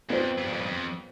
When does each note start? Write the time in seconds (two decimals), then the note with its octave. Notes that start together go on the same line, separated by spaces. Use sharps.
0.09 F2 B3 F4 C5
0.38 F2
0.45 G2
0.52 F2
0.61 G2
0.66 F2